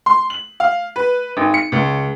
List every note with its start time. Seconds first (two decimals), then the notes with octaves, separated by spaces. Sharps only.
0.06 C6
0.30 F#7
0.60 F5
0.96 B4
1.37 G#1
1.54 C#7
1.72 C#2